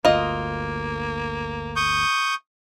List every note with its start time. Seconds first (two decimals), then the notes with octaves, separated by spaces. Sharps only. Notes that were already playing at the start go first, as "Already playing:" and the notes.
0.05 G1 D2 A#3 F4 D#5
1.76 C#6 D#6 G6